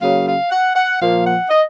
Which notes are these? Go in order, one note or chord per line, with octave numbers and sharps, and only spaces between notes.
C#3 F#3 A#3 F5
F5
F#5
F#5
A#2 F3 A#3 F5
F#5
D#5